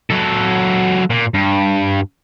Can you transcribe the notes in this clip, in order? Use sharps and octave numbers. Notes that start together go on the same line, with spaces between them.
F#3 A4
A#2
G2